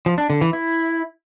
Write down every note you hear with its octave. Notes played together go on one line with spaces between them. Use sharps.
F3
D4
D3
E3
E4